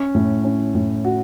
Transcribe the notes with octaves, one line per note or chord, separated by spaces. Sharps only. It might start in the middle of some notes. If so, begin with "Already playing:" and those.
Already playing: C#4
A2
C#4
A2
F#4